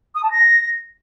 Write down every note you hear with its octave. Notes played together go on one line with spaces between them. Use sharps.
D#6
A5
A#6